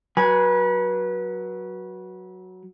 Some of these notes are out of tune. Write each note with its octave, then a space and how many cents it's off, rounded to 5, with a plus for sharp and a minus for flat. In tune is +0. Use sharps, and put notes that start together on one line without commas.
F#3 +0 B4 -30 G#5 +0